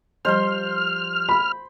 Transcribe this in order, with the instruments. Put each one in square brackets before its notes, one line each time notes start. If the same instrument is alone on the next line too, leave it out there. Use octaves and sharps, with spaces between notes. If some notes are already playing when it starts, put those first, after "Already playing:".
[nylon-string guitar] F3 G3 D#5 [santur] C5 C6 [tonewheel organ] F6
[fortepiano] B5